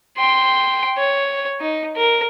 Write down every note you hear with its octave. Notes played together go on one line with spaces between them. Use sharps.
G5 C6
C#5
D#4
A#4